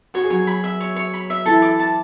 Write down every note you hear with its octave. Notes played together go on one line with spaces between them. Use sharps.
F#4 C#5
G#4
F#3 F#4 C#5
B5
E5
C#5
C#5
B5
E5
E3 E4 A4
D6
A5